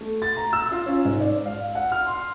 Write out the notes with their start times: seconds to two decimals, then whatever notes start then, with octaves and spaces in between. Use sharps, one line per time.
0.01 A3
0.22 A6
0.37 A#5
0.53 E6
0.72 F4
0.86 C#4
1.05 G#2
1.20 D5
1.45 F5
1.75 F#5
1.92 F6
2.07 C6